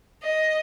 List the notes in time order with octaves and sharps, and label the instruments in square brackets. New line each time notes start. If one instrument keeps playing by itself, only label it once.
[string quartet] D#5